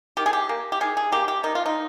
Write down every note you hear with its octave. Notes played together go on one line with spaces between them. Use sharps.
D#3 G4
G#4
G4
A#3
G4
D#3 G#4
G#4
A#3 G4
G4
D#3 D#4
F4
D#4